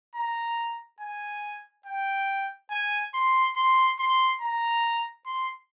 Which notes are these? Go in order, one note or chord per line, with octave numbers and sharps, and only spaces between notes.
A#5
G#5
G5
G#5
C6
C6
C6
A#5
C6